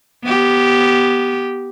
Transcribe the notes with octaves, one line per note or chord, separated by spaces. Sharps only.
B3 G4